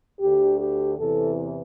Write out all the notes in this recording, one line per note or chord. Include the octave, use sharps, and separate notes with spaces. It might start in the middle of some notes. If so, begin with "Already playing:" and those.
D2 D3 G4
G4
E2 C3 E3 A4